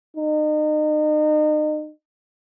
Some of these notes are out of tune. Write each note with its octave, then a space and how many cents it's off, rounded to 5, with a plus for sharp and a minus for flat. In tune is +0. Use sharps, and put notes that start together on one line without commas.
D#4 -35